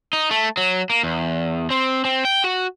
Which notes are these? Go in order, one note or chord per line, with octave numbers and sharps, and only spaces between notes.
D#4
A3
F#3
A#3
E2
C4
C4
G5
F#4